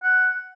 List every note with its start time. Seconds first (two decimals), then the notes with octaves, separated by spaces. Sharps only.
0.03 F#5